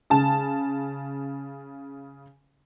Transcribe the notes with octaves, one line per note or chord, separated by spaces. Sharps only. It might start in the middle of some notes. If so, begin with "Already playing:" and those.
C#3 A5